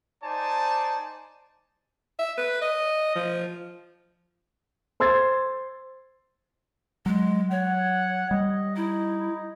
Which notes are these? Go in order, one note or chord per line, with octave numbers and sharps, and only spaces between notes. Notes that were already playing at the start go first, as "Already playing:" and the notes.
D#4 C5 D5 G#5 A5
E5
B4
D#5
F3
C5 C6 E6 G#6 A6
F#3 G#3
C#5 F#5
G3 D#5
D#4 E4